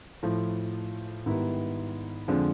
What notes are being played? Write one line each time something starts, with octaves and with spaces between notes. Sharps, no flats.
A2 F3 A3
G#2 D#3 G3 B3 E4
F2 D3 F3 G#3